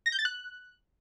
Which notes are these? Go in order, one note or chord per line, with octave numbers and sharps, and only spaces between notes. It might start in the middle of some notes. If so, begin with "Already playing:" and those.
A#6
G6
A6
F#6